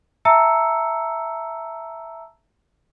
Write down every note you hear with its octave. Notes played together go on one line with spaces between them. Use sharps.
E5 A5 A#5 E6 C#7